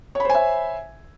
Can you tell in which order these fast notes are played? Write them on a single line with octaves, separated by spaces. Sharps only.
C#5 B5 C5 G#5 E5